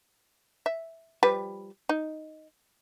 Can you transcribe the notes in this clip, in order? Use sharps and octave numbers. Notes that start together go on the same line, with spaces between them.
E5
F3 G3 B4
D#4